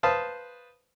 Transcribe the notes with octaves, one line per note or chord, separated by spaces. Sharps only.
B4 C5 F5 A5 D#6